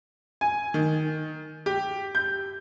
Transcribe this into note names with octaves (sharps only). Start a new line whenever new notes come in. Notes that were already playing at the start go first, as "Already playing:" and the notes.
G#5
D#3
G4
G6